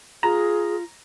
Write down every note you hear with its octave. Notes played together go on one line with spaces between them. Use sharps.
F4 G#4 A#5